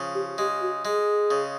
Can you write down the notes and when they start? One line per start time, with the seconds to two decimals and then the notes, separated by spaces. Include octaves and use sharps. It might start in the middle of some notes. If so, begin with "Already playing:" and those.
Already playing: C#3 F3
0.14 G4
0.38 G#3 G4
0.61 F#4
0.85 G#3 G#4
1.31 C#3